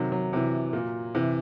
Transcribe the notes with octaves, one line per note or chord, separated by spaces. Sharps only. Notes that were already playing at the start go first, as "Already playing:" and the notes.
Already playing: C3 D#3 F#3
F#3
C3 E3
A#2
C3 E3